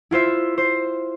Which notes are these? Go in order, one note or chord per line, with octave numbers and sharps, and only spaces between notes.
E4 F4 C5 E5
C5